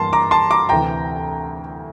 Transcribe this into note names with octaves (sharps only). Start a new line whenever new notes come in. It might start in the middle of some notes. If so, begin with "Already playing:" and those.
Already playing: G2 E3 A#3 A5 C6
A#5 D6
A5 C6
A#5 D6
D2 C3 E3 G5 A#5